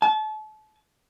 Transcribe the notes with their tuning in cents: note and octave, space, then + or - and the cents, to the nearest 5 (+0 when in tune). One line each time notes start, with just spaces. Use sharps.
A5 -35